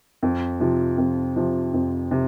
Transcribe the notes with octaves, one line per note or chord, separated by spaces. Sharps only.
F2
C3 F3
F2
C3 F3
F2
C3